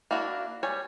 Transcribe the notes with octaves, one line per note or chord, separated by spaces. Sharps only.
A#3 D4 E4 F#4
G3 C#5 G#5